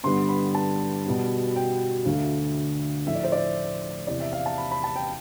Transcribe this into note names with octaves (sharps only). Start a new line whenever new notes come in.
G2 D3 G3 B3 C6
B5
A5
B2 G3 B3
G5
D2 D3 A3 F5
A2 F3 A3 E5
D5
C5
D5
E2 C3 E3 D5
E5
F5
A5
B5
B5
A5
G5